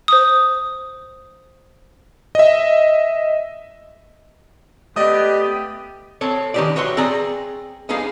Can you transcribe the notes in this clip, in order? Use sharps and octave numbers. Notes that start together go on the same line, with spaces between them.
C5 D#6
D#5 E5
A3 B3 G4 D5 D#5 D#6
C4 A4 C#5
D#3 C#4 D#4 G4 B4 D5
F#4 B4 C#5 E5 G5 C6
C4 G#4 D5 A#5
B3 C#4 D#4 G#4 F5